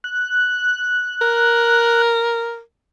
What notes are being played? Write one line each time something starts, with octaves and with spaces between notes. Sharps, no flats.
F#6
A#4